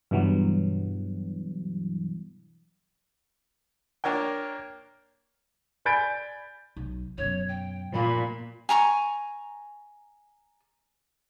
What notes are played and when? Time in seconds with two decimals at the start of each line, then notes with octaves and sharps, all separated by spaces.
0.11 G2 B2 E3 F#3
4.04 A#3 D4 A#4 C#5 G5
5.85 D5 G#5 B5 G6 A6 D7
6.76 B1
7.18 F#2 B2 C#5
7.48 G5
7.94 A#2 B5
8.69 G#5 A#5 C6 C#6